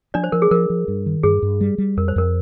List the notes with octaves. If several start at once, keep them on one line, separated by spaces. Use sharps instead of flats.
F3 D4 D5
C5
F3 A#4
G#4
F3 A#4
F3
G2
D#3
G2 G#4
G2
G3
G3
F2 A#4
C5
F2 A#4